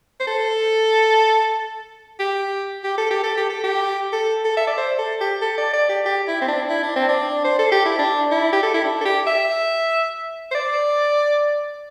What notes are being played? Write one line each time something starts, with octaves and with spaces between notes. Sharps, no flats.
C5
A4
G4
G4
A4
G4
A4
G4
A4
G4
A4
A4
E5
D5
C5
A4
G4
A4
D5
D5
G4
G4
E4
C4
D4
E4
D4
C4
D4
C5
A4
G4
E4
D4
E4
G4
A4
E4
D4
A4
G4
E5
C5
D5